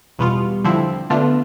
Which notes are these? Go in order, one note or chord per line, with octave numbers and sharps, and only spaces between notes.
E2 B2 G3 B3 F4
D3 F3 C4 E4
D3 A3 B3 D4 F4